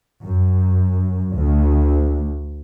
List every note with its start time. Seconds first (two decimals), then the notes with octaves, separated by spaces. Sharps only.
0.23 F#2
1.35 D2